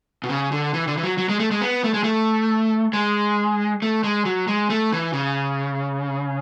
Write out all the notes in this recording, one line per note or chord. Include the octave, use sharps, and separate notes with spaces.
B2
C#3
D3
E3
D3
E3
F#3
F#3
G#3
A3
G#3
B3
A3
G#3
A3
G#3
A3
G#3
F#3
G#3
A3
E3
C#3